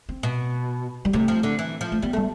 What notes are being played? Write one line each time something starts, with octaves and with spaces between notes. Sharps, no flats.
C4
B2
G3
C3 A3
F3
D3
E3
F3
A3
G3 B3
G3 A3